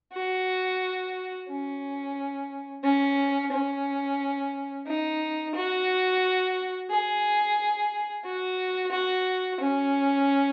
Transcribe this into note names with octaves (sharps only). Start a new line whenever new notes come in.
F#4
C#4
C#4
C#4
D#4
F#4
G#4
F#4
F#4
C#4